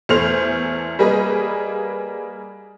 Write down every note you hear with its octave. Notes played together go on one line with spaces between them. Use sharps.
E2 A3 C5 F6 F7
G3 A#3 G#4 B4 D#5